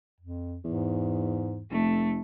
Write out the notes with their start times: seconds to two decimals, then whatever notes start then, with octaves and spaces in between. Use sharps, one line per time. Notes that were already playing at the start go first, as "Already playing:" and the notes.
0.20 F2
0.64 E2 G#2
1.71 F1 A3